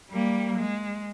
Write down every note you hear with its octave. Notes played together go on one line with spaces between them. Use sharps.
G3 A#3
G#3